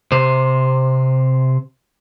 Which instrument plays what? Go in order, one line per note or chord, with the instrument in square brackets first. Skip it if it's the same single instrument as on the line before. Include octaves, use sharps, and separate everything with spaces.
[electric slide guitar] C3 C5